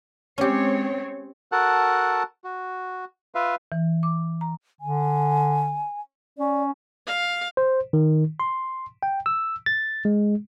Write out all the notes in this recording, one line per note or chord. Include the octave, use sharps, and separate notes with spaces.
G#3 C4 C#4 G4 C#5
F#4 A4 A#4 F#5 A5 F#6
F#4
F4 B4 E5 F5
E3
D6
A#5
D3 G#5
C#4 D5
F5
C5
D#3
C6
G5
E6
A6
G#3